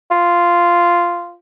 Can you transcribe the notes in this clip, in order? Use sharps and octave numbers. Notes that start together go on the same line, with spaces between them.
F4